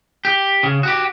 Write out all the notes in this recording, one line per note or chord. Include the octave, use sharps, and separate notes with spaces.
G4
C#3
F#4 G4